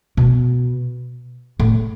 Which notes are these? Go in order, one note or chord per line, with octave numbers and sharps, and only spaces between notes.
B2
A2